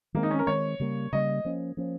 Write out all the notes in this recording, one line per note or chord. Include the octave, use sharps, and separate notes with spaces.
D#3 G#3 A#3 C4
D#4
C#4
A#4
D#3 G#3 C4 C#5
C#3 G3 A#3
C#3 G3 A#3 D#5
F3 A#3 C#4
F3 A#3 C#4